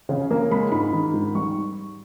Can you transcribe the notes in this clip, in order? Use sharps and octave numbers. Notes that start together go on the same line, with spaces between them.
C#3
A#3
G#3 B5
G#2 B5
D#3
G#2
G3 C#6